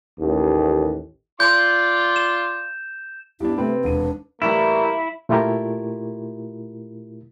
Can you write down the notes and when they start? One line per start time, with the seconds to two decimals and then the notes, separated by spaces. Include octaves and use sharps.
0.20 A1 D#2
1.40 F4 D5 C6 G6
2.16 E7
3.40 G2 B3 D4 E4 G4
3.58 C3 A3 C4 B4
3.84 E1 D4 D#7
4.42 A2 E3 G3 A#3 E4
5.29 A#2 A3 E4 F4 G4 A#4